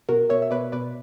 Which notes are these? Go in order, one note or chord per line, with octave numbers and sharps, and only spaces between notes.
B2 F#4 A#4
B2 C#5 E5
E5
B2 B4 D5
B2 B4 D5